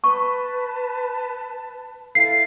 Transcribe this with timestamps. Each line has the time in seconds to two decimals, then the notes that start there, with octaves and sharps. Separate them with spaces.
0.04 B4 A5 C#6
2.15 E4 A4 F5 C7